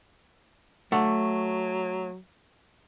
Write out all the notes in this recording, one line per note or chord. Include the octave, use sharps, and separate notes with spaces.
F#3 A3 F#5